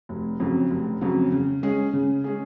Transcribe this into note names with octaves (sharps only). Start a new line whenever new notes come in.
F1
F2 C#3 F#3
F1
F2 C#3 F#3
C#3
G#3 C#4 G#4
C#3
G#3 C#4 G#4